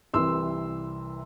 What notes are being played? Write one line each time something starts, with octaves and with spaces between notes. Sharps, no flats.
C2 C3 E3 C6 E6